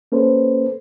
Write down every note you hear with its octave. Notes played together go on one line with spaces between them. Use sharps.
A#3 C#4 A4 B4 C5